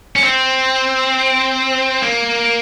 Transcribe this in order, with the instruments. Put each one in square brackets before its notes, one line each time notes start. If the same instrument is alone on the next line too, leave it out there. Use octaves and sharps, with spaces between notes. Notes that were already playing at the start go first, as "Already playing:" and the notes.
[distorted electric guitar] C#4
C4
A#3